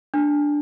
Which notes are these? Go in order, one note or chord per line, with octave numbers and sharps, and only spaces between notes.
D4